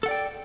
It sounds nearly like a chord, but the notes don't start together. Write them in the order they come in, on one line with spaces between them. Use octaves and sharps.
A4 F#5 D5 G5